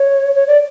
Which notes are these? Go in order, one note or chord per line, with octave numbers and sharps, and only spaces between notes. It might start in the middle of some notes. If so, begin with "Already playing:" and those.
Already playing: C#5
C#5
D5